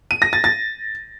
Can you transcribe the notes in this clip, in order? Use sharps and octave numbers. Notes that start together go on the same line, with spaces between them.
D#7
A#6
A6
A6